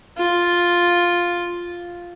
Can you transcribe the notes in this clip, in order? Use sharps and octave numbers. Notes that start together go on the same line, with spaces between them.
F4